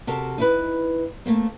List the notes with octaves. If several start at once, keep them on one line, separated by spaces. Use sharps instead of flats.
C3 F#4 G4 A4 A#4
D#4 E4 B4
A3 A#3 C4